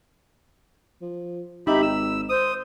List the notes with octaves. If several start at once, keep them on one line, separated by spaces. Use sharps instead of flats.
F3
G#1 D#4 G4 E5 B5
E6
C5 D#6